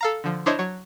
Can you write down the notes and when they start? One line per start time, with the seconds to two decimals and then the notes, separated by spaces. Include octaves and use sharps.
0.01 A4 F5 A#5
0.24 D3 F3
0.46 D4 E4 C5 C#5 D#5
0.59 F#3 C#5